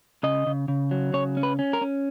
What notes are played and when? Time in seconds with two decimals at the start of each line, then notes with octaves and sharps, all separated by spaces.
0.23 C#3 D#5
0.47 C#3
0.68 C#3
0.91 F#3
1.14 C#3 C#5
1.37 C#4
1.43 B4
1.59 C#4
1.73 A#4
1.81 C#4